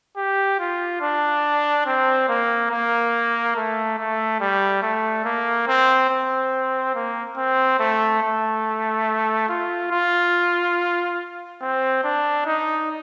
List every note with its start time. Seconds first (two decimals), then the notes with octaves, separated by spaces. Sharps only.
0.17 G4
0.59 F4
1.01 D4
1.86 C4
2.29 A#3
2.71 A#3
3.56 A3
3.98 A3
4.40 G3
4.82 A3
5.25 A#3
5.68 C4
6.10 C4
6.95 A#3
7.37 C4
7.80 A3
8.22 A3
9.49 F4
9.91 F4
11.61 C4
12.04 D4
12.46 D#4